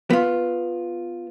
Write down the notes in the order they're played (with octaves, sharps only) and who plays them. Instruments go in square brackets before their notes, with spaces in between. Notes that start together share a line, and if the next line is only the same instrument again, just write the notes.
[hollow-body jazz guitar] B3 F4